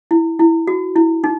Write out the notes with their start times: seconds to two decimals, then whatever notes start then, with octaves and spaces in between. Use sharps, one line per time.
0.11 E4
0.39 E4
0.67 F#4
0.96 E4
1.24 D#4